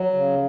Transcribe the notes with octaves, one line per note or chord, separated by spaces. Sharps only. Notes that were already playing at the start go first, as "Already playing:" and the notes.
Already playing: F#3
C#3